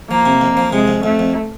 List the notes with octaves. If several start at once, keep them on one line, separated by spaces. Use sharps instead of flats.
F3 A#3
C3
F2
F3
C3 G#3
F2
F2 A3
F2